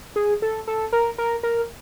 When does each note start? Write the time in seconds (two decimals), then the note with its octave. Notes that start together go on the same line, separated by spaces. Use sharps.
0.16 G#4
0.42 A4
0.67 A4
0.93 A#4
1.18 A#4
1.43 A#4